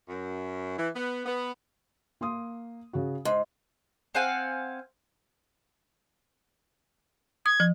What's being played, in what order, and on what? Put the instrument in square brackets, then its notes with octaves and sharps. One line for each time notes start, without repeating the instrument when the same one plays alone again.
[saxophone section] F#2
E3
B3
B3
[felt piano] A#3 C6 D#6
C#3 F#4
[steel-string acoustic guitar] G#2 [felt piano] C6
[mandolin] C4 F5 F#5 G#5
[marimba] D#6 [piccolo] G#6
[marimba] F3